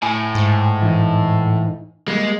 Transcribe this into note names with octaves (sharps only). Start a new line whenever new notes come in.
A2 G#5
G#2
E3 D#4
G3 G#3 A#3